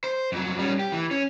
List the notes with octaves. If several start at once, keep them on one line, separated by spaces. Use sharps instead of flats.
C5
F2 F#3
G3 C#4
G4
E3
C#4